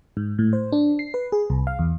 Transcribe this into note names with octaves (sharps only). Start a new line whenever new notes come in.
G#2
A2
C5
D4
C7
B4
G#4
C2
F5
E2